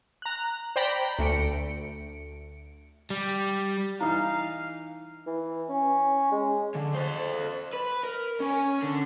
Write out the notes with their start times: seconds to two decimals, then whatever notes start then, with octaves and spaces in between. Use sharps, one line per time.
0.22 A#5 F#6
0.76 C5 D5 G5 A#5 B5
1.19 D2 A3 C#7 D7
3.10 G3
4.01 E3 D#4 F5 A#5
5.27 E3
5.70 C#4
6.32 G#3
6.75 D3
6.95 A4 C5
7.73 B4
8.03 A#4
8.40 C#4 G#5
8.83 D3